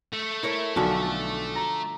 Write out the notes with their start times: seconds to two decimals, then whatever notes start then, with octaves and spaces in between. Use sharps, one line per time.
0.13 A3
0.43 E4 A#4 C#5
0.76 B1 D3 F3 F#4
1.55 A#5